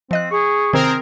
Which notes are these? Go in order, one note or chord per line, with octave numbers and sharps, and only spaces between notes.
F3 C4 D#5 F#6
G#4 C#6
C3 D#3 C4 G#4 A#4